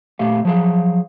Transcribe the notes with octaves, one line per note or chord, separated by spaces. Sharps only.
A#2 A3 G4 F5
F3 F#3 G#4 F5